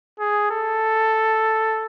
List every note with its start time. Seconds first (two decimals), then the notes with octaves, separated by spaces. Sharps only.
0.19 G#4
0.51 A4